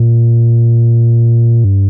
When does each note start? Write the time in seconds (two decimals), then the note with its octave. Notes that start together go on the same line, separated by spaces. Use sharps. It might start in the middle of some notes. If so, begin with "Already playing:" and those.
Already playing: A#2
1.64 G2